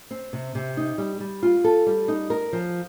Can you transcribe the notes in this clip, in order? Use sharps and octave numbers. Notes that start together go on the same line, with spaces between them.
C4
C3
C3
D#4
G3
G3
F4
A4
G3
D#4
A#4
F3